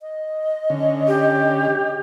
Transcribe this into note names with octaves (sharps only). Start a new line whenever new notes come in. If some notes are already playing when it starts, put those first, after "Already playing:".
D#5
D3 C#4
G4